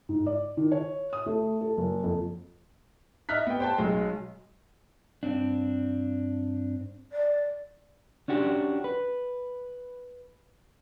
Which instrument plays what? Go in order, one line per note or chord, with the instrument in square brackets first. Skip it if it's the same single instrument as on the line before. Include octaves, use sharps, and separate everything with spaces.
[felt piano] G#2
D5
D#3
C#5
D#6
A3
A4
F#1
F2
[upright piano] D#5 E5 F6 F#6 B6
B3 G5
C5 G5 A5
B1 F#3 G#3
[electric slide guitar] G2 C4 D4
[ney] D5
[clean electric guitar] C#4 D4 F#4 G4
B4